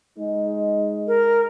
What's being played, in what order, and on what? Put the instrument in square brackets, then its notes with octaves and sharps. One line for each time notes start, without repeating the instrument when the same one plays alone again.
[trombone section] G#3 D#4
[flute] A#4